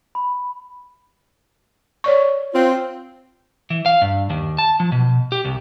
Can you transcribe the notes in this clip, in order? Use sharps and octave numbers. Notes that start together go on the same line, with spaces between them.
B5
C#5 D5 C#6
C4 F4
E3
F5
G2
D#2
A5
F3
B2
G4
C2